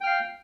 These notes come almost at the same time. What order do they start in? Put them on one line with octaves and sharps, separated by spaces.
G5 F6 F5